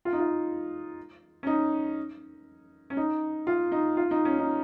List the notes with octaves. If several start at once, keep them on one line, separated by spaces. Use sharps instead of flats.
F4
D#4
F4
C#4
D#4
C#4
D#4
F4
D#4
F4
D#4
C#4
D#4